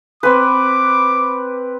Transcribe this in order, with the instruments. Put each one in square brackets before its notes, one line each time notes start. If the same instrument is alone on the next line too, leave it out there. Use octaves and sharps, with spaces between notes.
[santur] C4 B4 [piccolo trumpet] D6